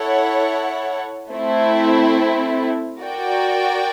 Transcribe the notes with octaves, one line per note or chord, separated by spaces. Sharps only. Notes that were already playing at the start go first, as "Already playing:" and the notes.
Already playing: E4 A4 C#5 F#5
A3 C4 E4
F#4 A#4 D5 G5